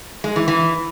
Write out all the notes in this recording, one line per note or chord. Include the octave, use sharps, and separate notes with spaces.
G#3
E3
E3